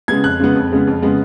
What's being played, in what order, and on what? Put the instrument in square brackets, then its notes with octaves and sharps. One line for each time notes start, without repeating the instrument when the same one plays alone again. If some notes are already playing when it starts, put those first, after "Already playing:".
[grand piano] C#3 G#3 B3 G#6
F2 F#6
C#3 G#3 B3
F2
C#3 G#3 B3
F2
C#3 G#3 B3